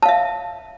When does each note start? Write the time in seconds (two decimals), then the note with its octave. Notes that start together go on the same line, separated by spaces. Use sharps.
0.03 A5
0.06 F5
0.09 E5